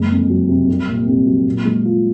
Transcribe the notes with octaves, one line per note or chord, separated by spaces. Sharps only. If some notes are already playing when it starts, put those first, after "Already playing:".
Already playing: F#1 G#3
F2
F#3
C3
C2
A#2
C2
F#3
A#2
G#3
F4